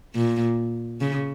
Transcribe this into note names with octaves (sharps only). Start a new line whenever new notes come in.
A#2
C#3